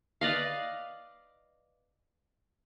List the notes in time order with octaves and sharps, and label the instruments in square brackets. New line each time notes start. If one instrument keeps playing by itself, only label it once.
[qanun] B4 D5 D#5 F5